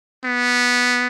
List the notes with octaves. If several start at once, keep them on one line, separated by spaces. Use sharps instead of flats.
B3